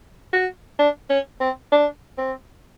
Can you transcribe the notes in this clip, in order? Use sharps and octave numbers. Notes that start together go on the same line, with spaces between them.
F#4
D4
C#4
C4
D4
C4